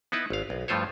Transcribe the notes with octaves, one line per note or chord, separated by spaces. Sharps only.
B3 D#4 E4 B4
G#1 F5
B1
G2 F3 A3 F4 C5 C#5